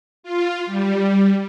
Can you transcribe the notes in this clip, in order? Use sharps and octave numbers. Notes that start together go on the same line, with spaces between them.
F4
G3